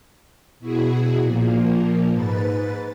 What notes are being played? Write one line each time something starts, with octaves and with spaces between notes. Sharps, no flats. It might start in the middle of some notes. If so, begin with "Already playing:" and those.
B2 E4 F#4 G#4
A#2 F3 A#3
G#2 B4 A6